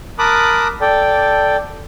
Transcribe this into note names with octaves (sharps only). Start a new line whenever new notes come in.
A#4 A5 B5 D6 D#6 F#6
A4 D5 G5